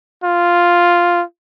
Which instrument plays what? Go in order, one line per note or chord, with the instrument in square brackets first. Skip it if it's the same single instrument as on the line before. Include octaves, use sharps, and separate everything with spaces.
[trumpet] F4